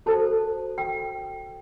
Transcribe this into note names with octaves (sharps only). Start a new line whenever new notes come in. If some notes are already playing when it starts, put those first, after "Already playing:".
F#4 A4 C5 A5
G5